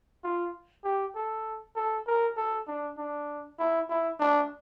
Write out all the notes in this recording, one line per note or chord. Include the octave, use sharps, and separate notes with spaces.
F4
G4
A4
A4
A#4
A4
D4
D4
E4
E4
D4